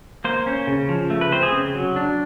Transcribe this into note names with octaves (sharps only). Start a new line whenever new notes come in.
A#3 C5
C#4
C#3
F3
A3
B4
C4 C5
G#4
C#3
F#3
D4